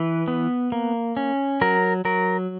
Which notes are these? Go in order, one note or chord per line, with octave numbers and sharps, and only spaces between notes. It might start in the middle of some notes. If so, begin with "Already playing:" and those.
Already playing: E3 B4
B3
A#3
C#4
F#3 A#4
F#3 A#4